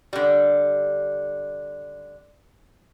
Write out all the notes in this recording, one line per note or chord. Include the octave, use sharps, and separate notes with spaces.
D3 G3